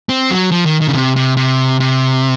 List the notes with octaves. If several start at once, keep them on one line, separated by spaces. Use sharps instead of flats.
C4
F#3
F3
D#3
D#3
C#3
C3
C3
C3
C3